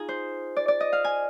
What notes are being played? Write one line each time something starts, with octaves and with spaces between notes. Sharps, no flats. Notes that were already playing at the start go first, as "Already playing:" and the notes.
Already playing: D#4 F4 G#4
C5
D5
D5
D#5
F5
G#5